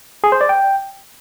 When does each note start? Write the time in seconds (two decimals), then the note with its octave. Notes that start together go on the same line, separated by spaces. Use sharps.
0.24 G#4
0.32 C5
0.41 D5
0.49 G5